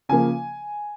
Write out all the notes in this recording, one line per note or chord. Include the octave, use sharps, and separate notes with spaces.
C#3 F3 A#3 G#5